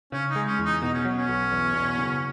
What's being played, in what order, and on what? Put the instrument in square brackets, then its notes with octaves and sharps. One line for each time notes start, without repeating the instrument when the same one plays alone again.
[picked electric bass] C#3 [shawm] C#4
[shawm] D#4
[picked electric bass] G#3
[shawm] C#4
[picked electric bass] E2
[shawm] D#4
[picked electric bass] B2 [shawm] D#4
[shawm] C#4
[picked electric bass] F#3
[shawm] C#4
[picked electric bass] B1
E2
B2
F#1